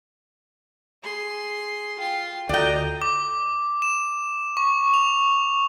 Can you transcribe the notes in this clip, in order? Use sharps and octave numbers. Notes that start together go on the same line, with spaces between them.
G#4 C6
F4 G5 C6
D2 F4 F#4 A4 D5 D#5 G5 A#5
D6
E7
C#6
F7